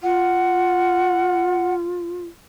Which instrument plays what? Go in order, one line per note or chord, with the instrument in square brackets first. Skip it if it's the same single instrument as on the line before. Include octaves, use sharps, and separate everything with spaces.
[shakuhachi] F4 [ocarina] F#5